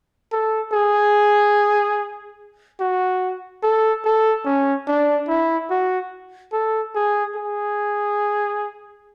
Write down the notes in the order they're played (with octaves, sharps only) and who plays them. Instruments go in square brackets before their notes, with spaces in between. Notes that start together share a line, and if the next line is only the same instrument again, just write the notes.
[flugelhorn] A4
G#4
F#4
A4
A4
C#4
D4
E4
F#4
A4
G#4
G#4